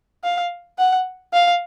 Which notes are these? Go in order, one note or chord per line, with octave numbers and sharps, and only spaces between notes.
F5
F#5
F5